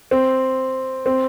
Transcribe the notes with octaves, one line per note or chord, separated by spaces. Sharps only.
C4
C4